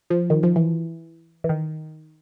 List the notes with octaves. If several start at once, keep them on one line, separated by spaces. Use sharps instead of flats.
F3
D#3
F3
E3
E3
D#3